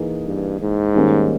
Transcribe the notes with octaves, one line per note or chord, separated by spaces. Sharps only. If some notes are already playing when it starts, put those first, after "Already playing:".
Already playing: E3 A#3 D#4 G#4
G2
G#2
D#3 G3 A#3 C#4